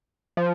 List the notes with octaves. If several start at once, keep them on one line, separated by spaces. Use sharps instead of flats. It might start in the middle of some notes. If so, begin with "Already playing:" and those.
F3